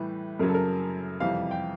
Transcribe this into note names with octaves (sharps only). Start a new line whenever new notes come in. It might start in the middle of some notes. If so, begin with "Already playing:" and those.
Already playing: A2 E3 G3 B4
F#2 C#3 F#3 A#4
A4
A#4
F2 C3 E3 G3 F5
G5